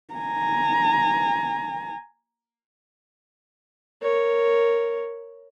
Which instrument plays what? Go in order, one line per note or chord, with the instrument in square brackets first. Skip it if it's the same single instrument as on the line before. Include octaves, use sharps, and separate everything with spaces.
[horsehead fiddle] G#5 A#5
[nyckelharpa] A#4 C#5